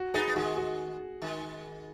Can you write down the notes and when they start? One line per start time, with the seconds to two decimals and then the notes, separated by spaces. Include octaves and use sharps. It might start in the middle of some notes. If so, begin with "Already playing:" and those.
Already playing: F#4
0.14 B3 D#4 G#4
0.27 B3
0.36 D#3 G#3 F#4
0.57 F#4
1.22 D#3 G#3